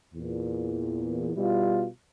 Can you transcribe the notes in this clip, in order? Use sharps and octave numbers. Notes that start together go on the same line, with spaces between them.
E2 A#2
B2 G3 E4 F4